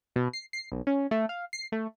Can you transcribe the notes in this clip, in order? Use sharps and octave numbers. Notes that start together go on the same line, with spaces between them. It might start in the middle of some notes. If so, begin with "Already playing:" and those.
B2
C7
C7
B1
C#4
A3
F5
C7
A3